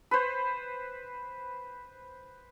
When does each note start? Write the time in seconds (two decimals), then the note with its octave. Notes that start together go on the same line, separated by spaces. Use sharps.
0.11 B4 C5